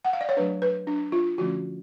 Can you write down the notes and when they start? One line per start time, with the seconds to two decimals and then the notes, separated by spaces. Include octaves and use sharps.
0.05 F#5
0.13 F5
0.21 D5
0.29 C#5
0.37 F#3 A3 D4 B4
0.62 B4
0.87 D4
1.12 F4
1.38 D3 F3 A3 C#4 F#4